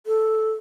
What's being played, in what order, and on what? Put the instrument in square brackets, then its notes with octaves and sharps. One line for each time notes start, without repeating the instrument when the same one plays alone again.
[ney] A4